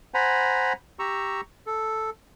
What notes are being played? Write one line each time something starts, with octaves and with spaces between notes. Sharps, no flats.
C5 F#5 G#5 A#5 B5
G4 A#5 C#6 E6
A4